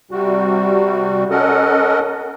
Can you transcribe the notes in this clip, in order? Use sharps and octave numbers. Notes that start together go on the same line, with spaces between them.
C3 G3 F#4
C#4 A4 A#4 D#5 F#5